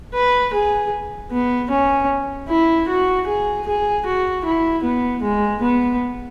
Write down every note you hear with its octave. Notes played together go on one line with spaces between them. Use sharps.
B4
G#4
B3
C#4
E4
F#4
G#4
G#4
F#4
E4
B3
G#3
B3